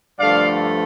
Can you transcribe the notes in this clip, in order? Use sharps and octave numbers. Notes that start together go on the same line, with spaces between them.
G2 D3 F3 A3 D5 F5